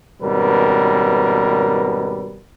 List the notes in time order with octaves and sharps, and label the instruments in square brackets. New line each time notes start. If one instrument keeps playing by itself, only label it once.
[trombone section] G#1 B2 G3 C#4 A#4 B4